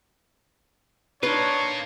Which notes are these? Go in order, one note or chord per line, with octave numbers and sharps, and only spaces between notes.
D4 D#4 F4 A#4 B4 C#5